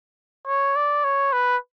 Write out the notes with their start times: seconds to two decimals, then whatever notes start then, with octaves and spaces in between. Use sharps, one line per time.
0.47 C#5
0.76 D5
1.04 C#5
1.33 B4